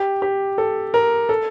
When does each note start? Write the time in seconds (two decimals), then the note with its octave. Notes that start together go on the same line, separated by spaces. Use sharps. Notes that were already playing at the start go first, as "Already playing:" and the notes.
Already playing: G4
0.22 G4
0.58 A4
0.94 A#4
1.29 A4